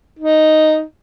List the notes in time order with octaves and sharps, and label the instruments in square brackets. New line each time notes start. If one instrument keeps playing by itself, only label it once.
[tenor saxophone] D#4